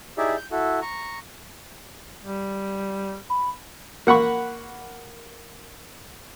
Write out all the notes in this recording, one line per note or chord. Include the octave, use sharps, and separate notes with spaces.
D#4 E4 G4 G#4 D5 E5
G6
E4 F#4 A4
A#5 C#6
G3
B5
A#3 F#5 B5 C#6